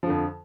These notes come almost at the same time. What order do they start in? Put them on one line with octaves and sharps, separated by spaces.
F3 D3 F2